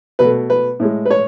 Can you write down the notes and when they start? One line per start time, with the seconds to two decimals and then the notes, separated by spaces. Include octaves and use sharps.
0.19 B2 A3 B4
0.50 B4
0.80 A2 G#3
1.06 B4
1.10 C#5